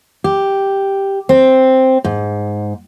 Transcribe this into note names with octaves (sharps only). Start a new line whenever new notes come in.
G4
C4
G#2